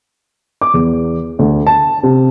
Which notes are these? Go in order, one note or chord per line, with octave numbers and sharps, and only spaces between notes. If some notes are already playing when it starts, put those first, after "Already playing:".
D6
E2
D2
A5
C3